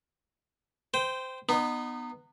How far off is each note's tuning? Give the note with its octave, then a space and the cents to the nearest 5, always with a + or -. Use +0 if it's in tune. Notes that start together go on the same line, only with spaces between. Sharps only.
C5 -15 G5 +0
B3 +0 D#4 -30